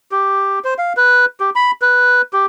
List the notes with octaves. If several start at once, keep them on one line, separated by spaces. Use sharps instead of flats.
G4
C5
F5
B4
G4
B5
B4
G4